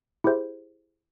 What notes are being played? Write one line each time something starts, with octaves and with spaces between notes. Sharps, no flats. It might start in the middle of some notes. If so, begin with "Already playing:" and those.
E4 G4 G#4 C5 E5